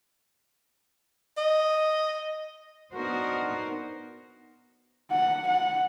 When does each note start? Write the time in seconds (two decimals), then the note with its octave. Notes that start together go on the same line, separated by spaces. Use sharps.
1.38 D#5
2.92 B3 D4 D#4 F#4 A#4 C5
5.11 F#5
5.48 F#5